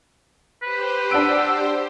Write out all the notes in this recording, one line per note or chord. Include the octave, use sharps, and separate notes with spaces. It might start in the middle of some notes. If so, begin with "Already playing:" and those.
G4 B4 C5
D4 F#5 E6 D7